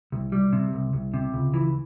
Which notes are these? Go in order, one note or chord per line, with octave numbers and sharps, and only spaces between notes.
C2
G3
C3
C2
C2
C3
C#2
E3